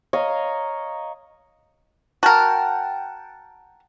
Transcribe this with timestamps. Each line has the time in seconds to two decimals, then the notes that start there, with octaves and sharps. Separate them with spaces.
0.13 C#5 D#5 F5 A#5
2.23 F#4 A#4 F#5 G5 A5